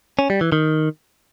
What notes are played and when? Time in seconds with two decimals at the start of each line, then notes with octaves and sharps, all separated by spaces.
0.19 C#4
0.30 G3
0.41 E3
0.52 D#3